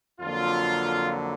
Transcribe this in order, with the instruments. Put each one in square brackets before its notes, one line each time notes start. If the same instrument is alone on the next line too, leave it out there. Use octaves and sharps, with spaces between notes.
[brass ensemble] F2 D3 F#3 A#3 F4